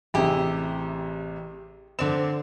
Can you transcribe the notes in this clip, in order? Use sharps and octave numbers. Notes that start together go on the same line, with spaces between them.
A1 C3 E4 G4 G#4
D3 C4 D5 E7